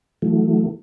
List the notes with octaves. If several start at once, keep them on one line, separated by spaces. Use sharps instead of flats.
E3 F#3 A3